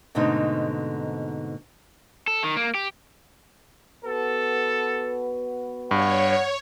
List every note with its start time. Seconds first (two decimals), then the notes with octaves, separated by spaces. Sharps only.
0.15 G#2 B2 D3 A3 C4 D#4
2.27 A4
2.44 D#3
2.57 A#3
2.74 G4
4.05 B3 F#4 A4 B4
5.91 G2 C#5 F#5